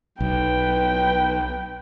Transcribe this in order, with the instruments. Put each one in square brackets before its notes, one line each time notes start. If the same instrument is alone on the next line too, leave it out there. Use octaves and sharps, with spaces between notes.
[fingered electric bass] B1 [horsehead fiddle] B4 G5